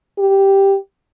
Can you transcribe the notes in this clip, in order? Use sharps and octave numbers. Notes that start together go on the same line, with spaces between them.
G4